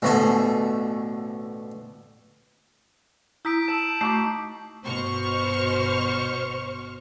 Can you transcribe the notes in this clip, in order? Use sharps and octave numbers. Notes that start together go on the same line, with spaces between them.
A1 D2 B2 A3 G#5 A5
E4 A#5 D#6 G6 B6 D7
A5 E6 E7
A3 D#4 F#4 D6
G1 B2 C5 C#6 F6